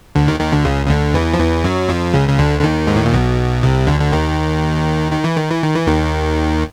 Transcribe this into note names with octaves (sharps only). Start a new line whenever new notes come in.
D2 D3
D#2 D#3
D#2 D#3
D2 D3
C#2 C#3
C#3
D2 D3
E2 E3
F3
E2 E3
F#2 F#3
F2 F3
C#2 C#3
C#3
D2 D3
D3
D#2 D#3
G#2
A2
A#2
B1 B2
C2 C3
D2 D3
D3
D#2 D#3
D#3
E3
D#3
E3
D#3
E3
D#2 D#3